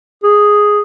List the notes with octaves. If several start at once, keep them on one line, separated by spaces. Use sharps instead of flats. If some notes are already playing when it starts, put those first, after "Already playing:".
G#4